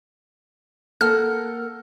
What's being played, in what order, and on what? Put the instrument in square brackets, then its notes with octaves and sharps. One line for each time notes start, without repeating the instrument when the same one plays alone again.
[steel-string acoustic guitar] A#3 A#4 F#5 [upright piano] A4 [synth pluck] F6